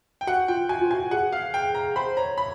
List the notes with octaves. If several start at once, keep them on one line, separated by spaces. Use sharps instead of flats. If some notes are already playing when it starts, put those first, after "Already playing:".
G5
F#4 F#5
F4 G5
F#4 G#5
F4
F#4 G#5
G#4 F#5
F5
G5
A#5
C5 B5
C#5 A#5
B5